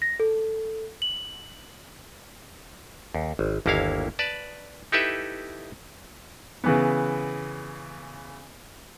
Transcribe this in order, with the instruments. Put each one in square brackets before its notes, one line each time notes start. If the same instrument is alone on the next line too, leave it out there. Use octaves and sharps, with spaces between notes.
[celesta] A#6
A4
F#7
[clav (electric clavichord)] D#2
G#1
G1 D#2 A#3 E4 C#5 F5
B4 D5 A5
D#4 E4 G4 A4 B4 E5
[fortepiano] C#3 E3 B3